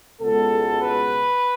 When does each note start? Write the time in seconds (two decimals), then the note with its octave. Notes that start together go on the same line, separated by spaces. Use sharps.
0.20 C#2 B2 G#3 B3 A4
0.80 B4